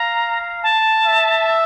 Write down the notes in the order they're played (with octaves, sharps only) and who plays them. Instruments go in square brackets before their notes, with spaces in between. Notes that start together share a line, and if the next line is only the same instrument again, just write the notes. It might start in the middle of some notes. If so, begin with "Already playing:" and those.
Already playing: [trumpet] F5 [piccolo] A#5
[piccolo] A5
[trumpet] E5